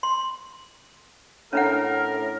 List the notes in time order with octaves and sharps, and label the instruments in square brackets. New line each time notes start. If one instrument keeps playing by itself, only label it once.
[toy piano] C6
[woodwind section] A2 A#4 [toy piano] C#4 D4 F#5